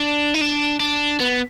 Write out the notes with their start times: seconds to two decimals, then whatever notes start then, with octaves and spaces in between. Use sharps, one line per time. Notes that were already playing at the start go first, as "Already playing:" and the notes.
Already playing: D4
0.34 D#4
0.41 D4
0.80 D4
1.20 B3